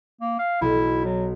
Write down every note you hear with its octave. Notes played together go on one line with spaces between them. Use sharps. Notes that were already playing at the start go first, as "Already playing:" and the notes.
A#3
F5
B1 E4
F#3